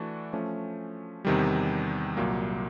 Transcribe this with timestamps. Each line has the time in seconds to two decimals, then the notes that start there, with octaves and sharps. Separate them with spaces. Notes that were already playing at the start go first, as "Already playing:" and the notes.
Already playing: E3 A3 D4 F#4
0.33 F3 A3 C#4
1.25 E2 C3 D#3 G3
2.17 C2 A#2 F#3 A#3